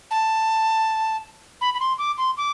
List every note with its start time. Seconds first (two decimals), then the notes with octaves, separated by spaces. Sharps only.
0.11 A5
1.61 B5
1.74 B5
1.80 C6
1.98 D6
2.18 C6
2.37 D6